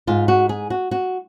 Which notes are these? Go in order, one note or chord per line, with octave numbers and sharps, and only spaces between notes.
G#2 F4
F#4
G#4
F#4
F#4